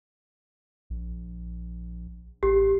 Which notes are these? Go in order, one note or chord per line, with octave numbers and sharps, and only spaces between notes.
A#1
A1 G4